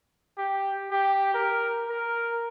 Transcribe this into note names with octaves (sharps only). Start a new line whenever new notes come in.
G4
G4
A#4
A#4